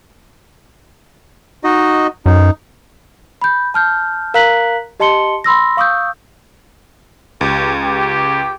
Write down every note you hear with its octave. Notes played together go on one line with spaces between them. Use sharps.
D#4 F#4 D#5
F#2 D#4
B5 G6
A5 F6 G6
A#4 F5 A#5 F#6 B6 F#7
G4 D#5 A5 C6 C#7 G7
B5 C6 E6 A#6
F5 C#6 D#6 E6 G6
C#2 G4
G4